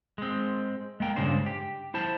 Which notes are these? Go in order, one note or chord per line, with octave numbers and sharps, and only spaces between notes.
G#3 C4
G#3 A#3 G5
G2 A#2 C#3 G#3 D4 C5
G4
E4 C5 A5